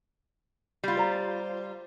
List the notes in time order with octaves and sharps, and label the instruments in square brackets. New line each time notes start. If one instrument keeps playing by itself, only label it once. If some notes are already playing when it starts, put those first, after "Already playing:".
[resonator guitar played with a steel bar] G3 F4
[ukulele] C5 A#5